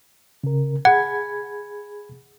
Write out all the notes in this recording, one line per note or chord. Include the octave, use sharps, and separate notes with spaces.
C#3 A#4
G#4 F#5 B5 G#6